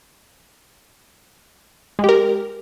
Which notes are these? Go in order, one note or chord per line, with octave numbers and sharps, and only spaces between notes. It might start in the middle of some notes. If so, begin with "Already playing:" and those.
G#3 G4 A#4